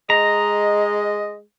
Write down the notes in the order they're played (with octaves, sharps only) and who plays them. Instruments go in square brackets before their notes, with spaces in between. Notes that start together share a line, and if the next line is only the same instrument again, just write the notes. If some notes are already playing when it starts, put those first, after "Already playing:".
[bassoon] G#3 [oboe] D#5 [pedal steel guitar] A#5